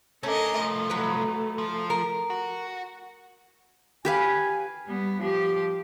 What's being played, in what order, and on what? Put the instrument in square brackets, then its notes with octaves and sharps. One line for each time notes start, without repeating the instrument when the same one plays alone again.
[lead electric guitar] A3 D4 [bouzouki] C#4 [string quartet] A4 A#4 D#5
[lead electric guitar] C2 F3 [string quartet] A3
[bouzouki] F#3 B4
[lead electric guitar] F3
[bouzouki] A#4
[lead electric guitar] F#4
[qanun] G4 B4 F5 [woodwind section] G#5
[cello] G3 B3
F3 G4